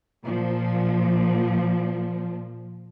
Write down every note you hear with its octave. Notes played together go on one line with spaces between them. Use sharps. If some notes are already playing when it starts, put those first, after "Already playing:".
A#2 F3